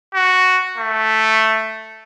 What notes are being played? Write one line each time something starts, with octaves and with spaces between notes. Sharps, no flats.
F#4
A3